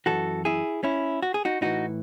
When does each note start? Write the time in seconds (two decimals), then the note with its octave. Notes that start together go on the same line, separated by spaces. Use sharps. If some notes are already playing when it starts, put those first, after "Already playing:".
0.06 F#2 C#3 E3 F#4 A4
0.45 E4 G#4
0.83 C#4 E4
1.23 F#4
1.34 G#4
1.45 D#4 F#4
1.61 A2 E3 D#4 F#4